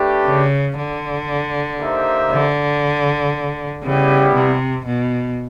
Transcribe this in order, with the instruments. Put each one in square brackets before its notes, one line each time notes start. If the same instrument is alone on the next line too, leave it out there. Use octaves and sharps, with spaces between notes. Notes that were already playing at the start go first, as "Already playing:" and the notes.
Already playing: [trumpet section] A3 D4 G4 B4
[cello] C#3
D3
[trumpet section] A#3 D#4 G4 C5 E5
[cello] D3
[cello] C#3 [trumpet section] G3 B3 E4 G4
[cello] C3
B2